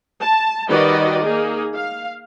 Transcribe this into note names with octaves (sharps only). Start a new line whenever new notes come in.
A5
D#3 G3 F#4 B4 D5 D#5
A#3 D#4 G#4
F5